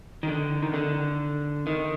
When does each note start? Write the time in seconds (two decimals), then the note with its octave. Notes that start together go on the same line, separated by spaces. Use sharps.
0.23 D#3
0.28 D3
0.63 D#3
0.74 D3
1.67 D#3